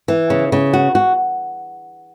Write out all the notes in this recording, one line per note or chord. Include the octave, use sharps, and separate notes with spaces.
E3
C#3
C#3
F#4
F#4